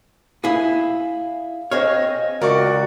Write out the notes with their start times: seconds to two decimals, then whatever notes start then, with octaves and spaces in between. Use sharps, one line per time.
0.44 E4 G#4 F5
1.71 C4 G#4 C#5 D#5 F6
2.42 C#2 F#4 A#4 D5 C#6